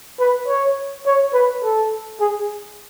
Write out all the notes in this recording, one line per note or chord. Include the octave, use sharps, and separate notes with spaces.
B4
C#5
C#5
B4
A4
G#4